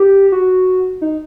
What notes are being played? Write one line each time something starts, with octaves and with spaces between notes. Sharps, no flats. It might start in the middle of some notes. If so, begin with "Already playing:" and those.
Already playing: G4
F#4
D#4